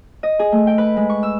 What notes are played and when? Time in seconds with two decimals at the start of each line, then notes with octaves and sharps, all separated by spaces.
0.23 D#5
0.39 G#4
0.52 A3
0.67 G5
0.78 B4
0.97 G#3
1.10 C#6
1.23 E6